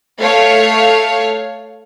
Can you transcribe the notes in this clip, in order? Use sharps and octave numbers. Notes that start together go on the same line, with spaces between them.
A3 C#5 F5